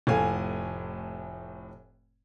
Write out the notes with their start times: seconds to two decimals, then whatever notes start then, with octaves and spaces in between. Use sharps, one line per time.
0.07 F1 A2 A3 F5 G#5